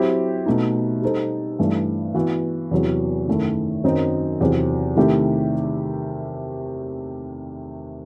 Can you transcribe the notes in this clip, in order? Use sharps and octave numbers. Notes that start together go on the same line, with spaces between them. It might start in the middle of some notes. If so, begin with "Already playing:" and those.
Already playing: F#3 C4 E4 G4
B2 A3 D#4
G3 D#4 A4 C5
G2 E3 A3
E3 B3 F#4 B4
E2 C3 F#3 B3
F#2 D#3 A3 E4
F#2 D#3 F#3 C4 D#4
E2 C3 F#3 C4
C3 D#3 A3 E4 G4